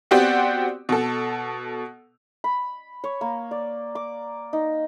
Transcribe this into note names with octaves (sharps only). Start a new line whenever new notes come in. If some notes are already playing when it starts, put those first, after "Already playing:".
B3 C4 F#4 G4 D5
B2 A4
B5
C#5
A#3
D5
D6
D#4